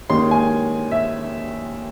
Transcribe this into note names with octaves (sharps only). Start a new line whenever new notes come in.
D#2 D#3 G#3 C#4 C6
G#5
E5